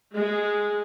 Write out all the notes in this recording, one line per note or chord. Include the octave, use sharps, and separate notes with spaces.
G#3